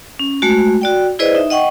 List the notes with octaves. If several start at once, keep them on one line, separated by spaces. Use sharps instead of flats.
C#4
G#3 A3 F#4
F#4 D5 G5
E4 G#4 B4 C5 D5 D#5
D#4 E5
D#5 F#5 G5 C#6